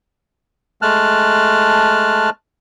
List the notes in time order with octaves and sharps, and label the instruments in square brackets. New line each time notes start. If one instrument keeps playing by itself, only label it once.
[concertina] G#3 A3 A5 F6 F#6